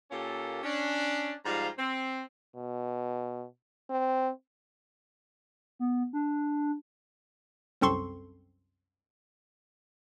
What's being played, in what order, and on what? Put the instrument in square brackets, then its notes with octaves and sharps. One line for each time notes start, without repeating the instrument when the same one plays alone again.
[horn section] A#2 A#3 C#4 G4 A4
C#4 D4
G#2 F3 G3 F4 F5 A#5
C4
[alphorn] B2
C4
[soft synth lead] B3
D4
[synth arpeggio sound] C2 F#2 C4 A4 C6 C#6